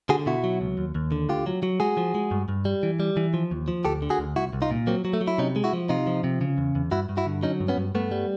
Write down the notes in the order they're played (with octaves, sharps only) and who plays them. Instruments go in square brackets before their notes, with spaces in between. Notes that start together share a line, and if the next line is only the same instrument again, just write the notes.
[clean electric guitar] D3 F#4 G#4
B2 E4 F#4
F#3
C#2
D#2
D#2
D3
D2 F4 G4
F#3
F#3
G#3 F#4 G#4
F3
G#3
G2
G2
G3
E3
G3
E3
F3
D#2
F3
D2 G4 A4
D3
F#4 G#4
D2
C2 E4 F#4
C2
D#4 F4
A#2
F#3 A#3 C4
F#3
A3
F#3
E4
C3 C#4 D#4
G#3
E4 F#4
F3
C3 D#4 F4
F3
C3
C#3
E2
E2
G2 E4 F#4
G2
E4 F#4
D3
F#3 C#4 D#4
G2
B3 C#4
G2
G2 A3 B3
G3